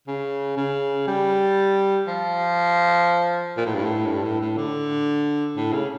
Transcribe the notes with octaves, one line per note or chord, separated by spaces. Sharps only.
C#3
C#3
G3
F3
A#2
A2
G2
A2
G2
A2
A2
D3
A2
C#3